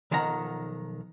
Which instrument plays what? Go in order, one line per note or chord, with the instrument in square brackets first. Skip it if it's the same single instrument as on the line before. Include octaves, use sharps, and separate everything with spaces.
[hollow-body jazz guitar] B1 D#3 F3 F#5 A#5